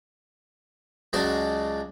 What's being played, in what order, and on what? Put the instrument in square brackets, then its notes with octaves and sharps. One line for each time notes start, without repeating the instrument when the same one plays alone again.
[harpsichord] C#2 F#3 G#3 F#4 D5 A5